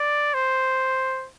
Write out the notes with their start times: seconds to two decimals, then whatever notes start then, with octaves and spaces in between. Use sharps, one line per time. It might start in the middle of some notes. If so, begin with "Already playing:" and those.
Already playing: D5
0.34 C5